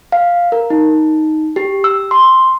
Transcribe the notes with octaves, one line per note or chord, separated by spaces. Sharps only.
F5
A#4
D#4
G4
E6
C6